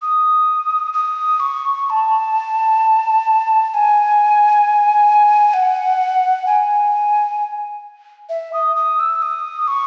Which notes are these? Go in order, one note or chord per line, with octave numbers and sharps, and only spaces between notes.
D#6
D#6
C#6
C#6
A5
A5
G#5
F#5
G#5
E5
D#6
D#6
E6
D#6
C#6